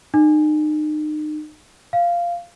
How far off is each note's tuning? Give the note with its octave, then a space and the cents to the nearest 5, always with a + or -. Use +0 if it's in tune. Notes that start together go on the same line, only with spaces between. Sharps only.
D#4 -35
F5 -10